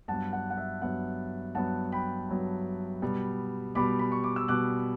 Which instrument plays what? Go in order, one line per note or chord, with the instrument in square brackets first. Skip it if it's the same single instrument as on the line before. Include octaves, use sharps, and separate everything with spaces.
[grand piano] G2 F#3 B3 F#5 A5
F#5
F#5
E5
G2 F#3 B3 F#5
G2 F#3 B3 F#5 A5
G5 B5
G2 F#3 B3
B2 G3 B3
B2 G3 B3 B5 D6
B5
C#6
D6
E6
B2 G3 B3 D6 F#6